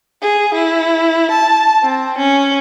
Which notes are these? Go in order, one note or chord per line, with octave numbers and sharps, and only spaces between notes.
G#4
E4
A5
C4
C#4